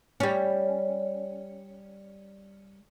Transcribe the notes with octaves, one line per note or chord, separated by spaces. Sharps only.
G3 C#4